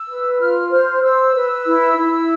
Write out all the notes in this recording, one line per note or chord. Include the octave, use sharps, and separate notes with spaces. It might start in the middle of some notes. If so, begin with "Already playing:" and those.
Already playing: E6
B4
E6
F4 F6
C5 F6
C5 E6
B4
E4
E4